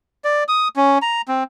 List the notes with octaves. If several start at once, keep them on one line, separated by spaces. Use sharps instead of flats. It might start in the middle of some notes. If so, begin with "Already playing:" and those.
D5
D#6
C#4
A#5
C4